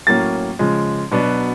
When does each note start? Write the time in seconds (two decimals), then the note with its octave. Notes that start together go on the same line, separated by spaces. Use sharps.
0.07 A2 F#3 A#3 C#4 A6
0.59 C#3 F3 G#3
1.11 B2 F#3 B3 D4